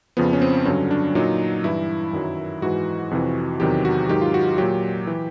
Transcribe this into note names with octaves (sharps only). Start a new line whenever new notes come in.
F2 C#3 F3 B3
C#4
C4
G2 D3 F#3 C#4
D4
A#2 F#3 D#4
G2 E3 E4
F#2 D#3 F#3
G#2 E3 F#4
F2 C3 E3
E2 C3 D#3 F#3 G4
F#4
G#2 D#3 F#3 G4
F4
F#4
A#2 F#3 G4
E3